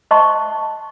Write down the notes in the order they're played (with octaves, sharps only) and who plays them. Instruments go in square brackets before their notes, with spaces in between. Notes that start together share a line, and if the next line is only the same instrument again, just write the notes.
[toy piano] C5 D#5 A5 C6 C#6